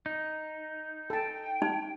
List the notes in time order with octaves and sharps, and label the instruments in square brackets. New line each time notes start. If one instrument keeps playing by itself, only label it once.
[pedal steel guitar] D#4
[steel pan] A4 A5 [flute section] G5
[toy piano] D#4